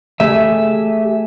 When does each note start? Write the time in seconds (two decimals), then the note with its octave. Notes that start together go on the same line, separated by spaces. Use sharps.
0.20 A3 G4 G#4 E5